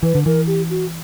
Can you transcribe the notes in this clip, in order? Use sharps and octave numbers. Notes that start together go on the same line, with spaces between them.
E3 B4
D3
E3 A#4
G4
F#4